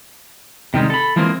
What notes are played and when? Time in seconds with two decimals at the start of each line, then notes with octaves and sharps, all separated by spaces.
0.74 C3 D#3 G3 G#3
0.90 A4 B5
1.16 E3 F3 G#3 A#3 C4